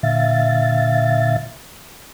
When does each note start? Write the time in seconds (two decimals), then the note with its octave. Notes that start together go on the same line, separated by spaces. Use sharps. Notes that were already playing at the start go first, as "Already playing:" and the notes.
0.03 A#2 D3 E5 F5 A6